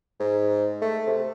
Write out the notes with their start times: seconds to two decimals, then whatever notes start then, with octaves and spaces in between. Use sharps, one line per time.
0.20 G#2
0.82 A3
1.07 C3